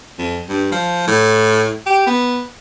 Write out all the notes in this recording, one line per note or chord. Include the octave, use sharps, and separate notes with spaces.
F2
G2
F3
A2
G4
B3